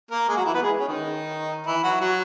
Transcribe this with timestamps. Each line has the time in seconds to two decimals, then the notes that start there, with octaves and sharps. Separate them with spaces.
0.11 A#3 A#4
0.28 G#3 G#4
0.36 F#3 F#4
0.46 E3 E4
0.54 B3 B4
0.62 G#3 G#4
0.80 C#4
0.88 D#3 D#4
1.66 E3 E4
1.84 F#3 F#4
2.01 F#3 F#4